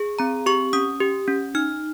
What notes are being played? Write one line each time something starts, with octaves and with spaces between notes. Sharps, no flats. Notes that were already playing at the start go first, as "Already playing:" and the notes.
Already playing: G#4
C4 A#5
G4 C#6
C#4 D#6
G4
C#4
D#4 F6